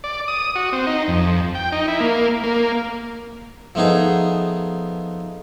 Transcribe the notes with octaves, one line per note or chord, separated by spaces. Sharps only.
D5
D#6
F#4
C4
D#4
F2
G5
D#4
E4
A#3
A#3
F3 A3 B3 D#4 G#4